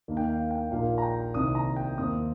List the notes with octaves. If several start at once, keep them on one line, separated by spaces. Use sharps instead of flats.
D#2 D#3 A#3 D#4
G5
F5
G5
A#1 A#2 A#3 D#4 F5
A#5
G5
C2 C3 D#3 C4 D#4 D#6
A#5
G5
D#2 D#3 C4 D#6